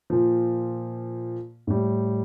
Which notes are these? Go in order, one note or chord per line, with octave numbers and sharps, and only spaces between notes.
A#2 F3
A2 G3